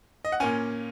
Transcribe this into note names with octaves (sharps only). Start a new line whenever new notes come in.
D#5
F#5
A#2 A#3 C#4 G#5